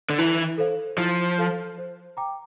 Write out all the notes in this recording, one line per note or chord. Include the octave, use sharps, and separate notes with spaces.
D3
E3 E4
A4 C5 F5
F3 E4
A4 C5 F5
C5
G5 A#5 D6